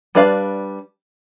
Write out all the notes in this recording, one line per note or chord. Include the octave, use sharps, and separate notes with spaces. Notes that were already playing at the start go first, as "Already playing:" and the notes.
G3 D4 B4 D5 F5